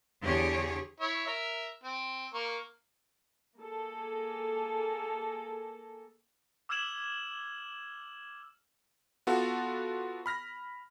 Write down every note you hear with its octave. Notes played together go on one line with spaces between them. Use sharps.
E2 D3 G4 G#4 C#5
E4 C#5 E5
A#4 E5
C4
A#3 A#4 C#6
A#3 G#4 A4
D6 E6 F6 G#6 E7 F#7
B3 F4 F#4 A4
B5 F6 A#6